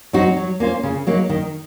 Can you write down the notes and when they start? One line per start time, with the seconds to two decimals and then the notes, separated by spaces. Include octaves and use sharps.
0.13 F#3 C4 D#4 F#4
0.37 F#3
0.60 A#3 C#4 F4 C5
0.83 C#3
1.07 F#3 A#3 D#4
1.30 D#3